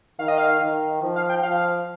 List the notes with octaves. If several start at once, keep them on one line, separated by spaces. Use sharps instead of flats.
D#3 F5
D#5
F5
D#3
F3
F5
G5
F3 F5